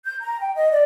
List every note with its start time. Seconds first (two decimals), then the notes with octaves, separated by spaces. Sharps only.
0.05 G6
0.21 A#5
0.40 G5
0.55 D#5
0.71 D5